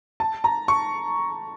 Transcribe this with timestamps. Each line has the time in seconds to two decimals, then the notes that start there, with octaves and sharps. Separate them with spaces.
0.20 A5
0.44 A#5
0.68 C#6